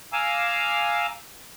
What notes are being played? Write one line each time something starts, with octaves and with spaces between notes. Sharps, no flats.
F5 G#5 A#5 D6 E6